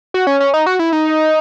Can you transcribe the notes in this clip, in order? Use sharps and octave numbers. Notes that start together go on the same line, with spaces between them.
F#4
C#4
C#4
D#4
F#4
E4
D#4